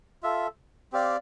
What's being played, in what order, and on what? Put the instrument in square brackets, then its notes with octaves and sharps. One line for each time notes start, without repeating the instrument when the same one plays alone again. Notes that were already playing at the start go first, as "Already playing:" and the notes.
[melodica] F4 A4 E5
C4 G4 D5 F5